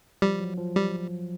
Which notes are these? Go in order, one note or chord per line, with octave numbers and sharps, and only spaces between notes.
F3 G3
F#3
F3
G3